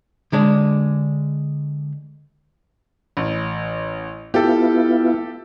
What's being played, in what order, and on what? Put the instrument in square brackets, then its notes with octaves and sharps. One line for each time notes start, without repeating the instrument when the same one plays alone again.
[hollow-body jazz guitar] D3 G#3 D4
[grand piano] A1
[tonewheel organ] B3 E4 F4 [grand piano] G4 A4